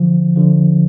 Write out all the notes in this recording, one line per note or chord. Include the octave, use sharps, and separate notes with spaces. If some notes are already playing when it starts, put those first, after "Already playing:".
Already playing: D3 F3
D3 F3